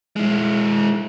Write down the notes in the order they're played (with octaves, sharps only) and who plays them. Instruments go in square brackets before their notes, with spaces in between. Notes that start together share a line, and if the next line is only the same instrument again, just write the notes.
[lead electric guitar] G#3 E4